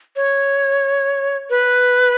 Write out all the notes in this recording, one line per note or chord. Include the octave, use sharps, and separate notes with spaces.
C#5
B4